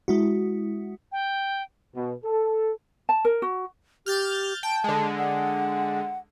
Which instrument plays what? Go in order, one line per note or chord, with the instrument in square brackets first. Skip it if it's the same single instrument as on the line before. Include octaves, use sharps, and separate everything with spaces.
[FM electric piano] G#3 E4 F#4
[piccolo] G5
[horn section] B2
A4
[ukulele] A5
A#4
F#4
[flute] G4 [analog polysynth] F6 G6 A6
[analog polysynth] G5 [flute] A5
[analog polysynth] D3 G#3
[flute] F#5